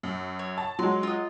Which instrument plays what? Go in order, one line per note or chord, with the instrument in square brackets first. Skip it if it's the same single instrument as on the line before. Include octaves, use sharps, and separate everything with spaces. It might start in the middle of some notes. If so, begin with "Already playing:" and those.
[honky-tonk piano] F#2
[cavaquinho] C#5
[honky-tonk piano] A5
[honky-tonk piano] F#3 G#3 [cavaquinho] C6
[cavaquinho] F4 D#5